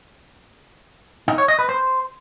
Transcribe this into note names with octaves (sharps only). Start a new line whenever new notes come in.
D#4
C#5
D#5
B4
C5